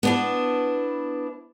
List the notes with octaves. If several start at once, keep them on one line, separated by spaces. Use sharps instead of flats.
B3 D4 E4